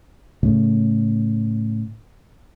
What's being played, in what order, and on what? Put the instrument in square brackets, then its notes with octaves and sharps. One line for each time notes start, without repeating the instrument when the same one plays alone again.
[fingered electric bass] A2 C#3 A3